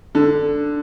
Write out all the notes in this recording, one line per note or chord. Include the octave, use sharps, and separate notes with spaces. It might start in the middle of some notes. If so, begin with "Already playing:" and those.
D3